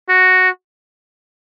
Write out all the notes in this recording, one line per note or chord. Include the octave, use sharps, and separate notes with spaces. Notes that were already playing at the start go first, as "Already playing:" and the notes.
F#4